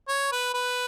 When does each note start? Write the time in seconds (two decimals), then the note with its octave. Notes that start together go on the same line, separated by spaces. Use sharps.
0.09 C#5
0.32 B4
0.54 B4